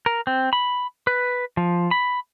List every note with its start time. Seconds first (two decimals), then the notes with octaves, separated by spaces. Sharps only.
0.06 A#4
0.27 C4
0.53 B5
1.07 B4
1.57 F3
1.91 B5